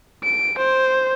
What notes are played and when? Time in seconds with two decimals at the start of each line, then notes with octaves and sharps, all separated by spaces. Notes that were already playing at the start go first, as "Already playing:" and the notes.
0.24 D7
0.58 C5